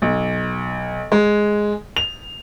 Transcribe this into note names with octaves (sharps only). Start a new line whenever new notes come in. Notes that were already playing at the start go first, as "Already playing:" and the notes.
B1
G#3
F7